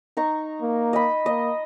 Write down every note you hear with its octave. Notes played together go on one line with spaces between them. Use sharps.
D#4 A#5 C#6
A#3
D#5 B5
A#3 D#5